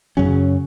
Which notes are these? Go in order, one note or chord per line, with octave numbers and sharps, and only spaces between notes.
F#2 C#3 F#3 C#4